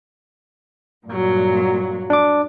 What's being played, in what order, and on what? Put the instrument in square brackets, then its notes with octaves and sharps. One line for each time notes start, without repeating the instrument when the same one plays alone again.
[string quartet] G2 A#2 F#3
[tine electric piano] D4 D6